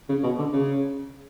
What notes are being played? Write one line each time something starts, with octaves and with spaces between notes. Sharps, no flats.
C#3
B2
D3
C#3